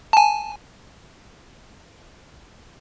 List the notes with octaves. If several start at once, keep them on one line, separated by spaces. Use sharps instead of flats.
G#5 A5